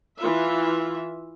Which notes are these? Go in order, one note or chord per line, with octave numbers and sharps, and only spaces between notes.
E3 F4 E5